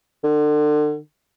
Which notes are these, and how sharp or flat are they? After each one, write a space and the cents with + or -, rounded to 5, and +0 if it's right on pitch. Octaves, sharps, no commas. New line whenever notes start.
D3 +35